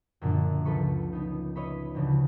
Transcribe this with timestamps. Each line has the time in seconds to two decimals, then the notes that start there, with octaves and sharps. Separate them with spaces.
0.21 F#2 A#2 D3 F3
0.65 C#2 F3 A4 B4 C#6
1.12 B3 D#4
1.55 B4 C#5 D#5 E5 B5
1.95 D2 C#3 F3